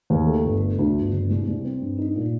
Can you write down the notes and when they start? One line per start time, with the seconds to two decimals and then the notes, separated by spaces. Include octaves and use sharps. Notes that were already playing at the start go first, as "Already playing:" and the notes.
0.10 D#2
0.27 A3
0.44 G1
0.61 A3
0.79 D2
0.96 G1
1.13 G1
1.30 C2
1.47 C2
1.64 C4
1.81 G2
1.99 D#4
2.16 A#2